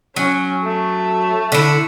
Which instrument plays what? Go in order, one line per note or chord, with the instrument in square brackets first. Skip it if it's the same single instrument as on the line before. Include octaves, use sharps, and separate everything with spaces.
[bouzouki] F#3 [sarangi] C#4
[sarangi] A3
[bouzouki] D3 E4